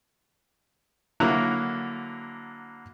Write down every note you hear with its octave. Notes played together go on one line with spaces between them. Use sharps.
D3 F#3 A#3 E4 A#5 F#6